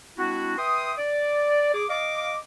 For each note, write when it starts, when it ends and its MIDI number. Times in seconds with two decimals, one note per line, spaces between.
0.18 0.56 56
0.18 0.56 60
0.18 0.56 62
0.18 0.56 64
0.18 0.56 66
0.58 0.93 71
0.58 0.93 76
0.58 0.93 79
0.58 0.93 84
0.58 0.93 87
0.98 1.73 74
1.74 1.85 68
1.74 1.85 86
1.90 2.38 75
1.90 2.38 77
1.90 2.38 86